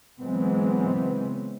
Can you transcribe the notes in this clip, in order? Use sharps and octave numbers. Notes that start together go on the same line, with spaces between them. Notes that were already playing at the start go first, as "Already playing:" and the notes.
C#3 E3 F#3 G#3 B3 C4